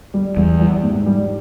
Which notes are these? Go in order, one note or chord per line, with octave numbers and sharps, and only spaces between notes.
G3
E2 G3
G3
G#2
G3